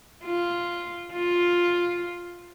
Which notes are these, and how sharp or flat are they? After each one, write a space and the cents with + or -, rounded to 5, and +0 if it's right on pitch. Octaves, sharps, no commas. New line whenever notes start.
F4 -5
F4 +5